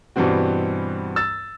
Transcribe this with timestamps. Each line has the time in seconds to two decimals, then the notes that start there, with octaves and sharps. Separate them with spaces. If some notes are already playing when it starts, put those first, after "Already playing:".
0.16 G2 B2 E3 G3 C4 F#4
1.16 E6 A6